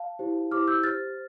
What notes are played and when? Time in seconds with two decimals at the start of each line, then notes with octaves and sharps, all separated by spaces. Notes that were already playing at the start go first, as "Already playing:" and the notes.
Already playing: F5 A5
0.19 E4 G4 C5
0.51 E4 G4 C5 D6 F6
0.68 E6 G6
0.84 G4 C5 F6 A6